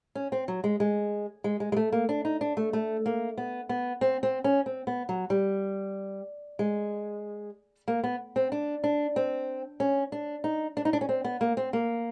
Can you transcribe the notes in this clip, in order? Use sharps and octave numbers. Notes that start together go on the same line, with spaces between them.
C#4
C4
F#3
G#3
G#3
G#3
G#3
G#3
A3
A#3
D4
D#4
D4
A3
A3
A#3
B3
B3
C4
C4
C#4
C4
B3
F#3
G3
G#3
A#3
B3
C4
D4
D4
C4
C#4
D4
D#4
D4
D#4
D4
C#4
C4
B3
A#3
C4
A#3